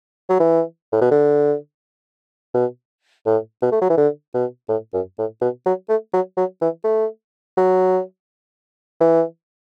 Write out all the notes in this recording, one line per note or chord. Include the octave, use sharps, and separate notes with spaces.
F#3
E3
A2
B2
D3
B2
A2
B2
A3
F#3
E3
D3
B2
A2
F#2
A2
B2
F#3
A3
F#3
F#3
E3
A3
F#3
E3